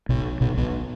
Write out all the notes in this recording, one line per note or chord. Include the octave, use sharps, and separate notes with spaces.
B1 B2
B1 B2
B1 B2